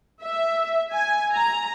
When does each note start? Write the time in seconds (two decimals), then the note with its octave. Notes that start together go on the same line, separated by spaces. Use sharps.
0.22 E5
0.92 G#5
1.33 A#5